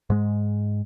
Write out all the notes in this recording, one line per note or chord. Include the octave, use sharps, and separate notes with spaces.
G#2 G#3